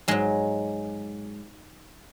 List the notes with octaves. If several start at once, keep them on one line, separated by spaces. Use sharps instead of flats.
G#2 F#3 G#3